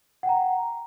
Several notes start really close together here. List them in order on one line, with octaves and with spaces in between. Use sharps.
F#5 G5 A#5